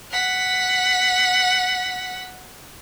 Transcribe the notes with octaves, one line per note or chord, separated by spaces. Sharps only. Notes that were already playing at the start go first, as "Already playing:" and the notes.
F#5 B6